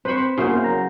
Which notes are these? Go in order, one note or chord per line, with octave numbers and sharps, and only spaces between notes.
C4 B4 C5 B5 C#6
C#3 A#3 B3 E4 F#4 A#4 C5
F#3 A#5